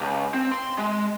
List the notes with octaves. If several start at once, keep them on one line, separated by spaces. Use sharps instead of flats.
C#2
C4
C6
G#3